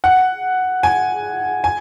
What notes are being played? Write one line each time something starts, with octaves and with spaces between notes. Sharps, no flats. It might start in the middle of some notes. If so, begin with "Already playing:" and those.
F#5
G#5
G#5